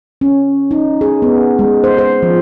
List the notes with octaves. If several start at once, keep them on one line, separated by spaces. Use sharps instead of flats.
C#4
D#4
G#4
B3
G#3
C5
C5
F3